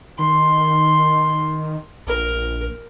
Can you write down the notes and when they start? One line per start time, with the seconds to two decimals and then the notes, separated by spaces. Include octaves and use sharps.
0.19 D#3 C6
2.07 A#1 A#4